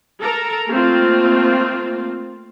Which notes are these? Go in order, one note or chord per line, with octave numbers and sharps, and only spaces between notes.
A4 A#4 A#5
A3 A#3 C4 F4